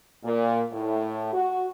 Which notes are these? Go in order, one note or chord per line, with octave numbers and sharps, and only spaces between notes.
A#2
A2
F#4